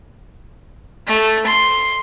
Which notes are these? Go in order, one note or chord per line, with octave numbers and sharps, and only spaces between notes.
A3
C6